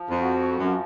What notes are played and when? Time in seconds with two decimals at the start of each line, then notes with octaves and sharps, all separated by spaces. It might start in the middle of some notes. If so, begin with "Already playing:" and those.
Already playing: F3
0.10 F2
0.21 F#4
0.59 F#2 F3